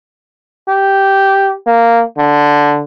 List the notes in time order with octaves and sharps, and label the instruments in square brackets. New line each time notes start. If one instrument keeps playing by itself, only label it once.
[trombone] G4
A#3
D3